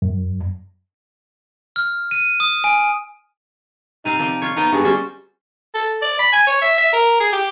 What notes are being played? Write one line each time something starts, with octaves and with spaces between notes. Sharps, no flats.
F#2
F6
D#7
D#6
G#5
C3 C4 D#4 F5
F3 C4 D5
F4 C#5
F3 B3 D#4 G5
G2 G#3 B3 F#4
F#3 G3 C#4 C5
A4
D5
B5
G#5
C#5
E5
E5
A#4
G#4
G4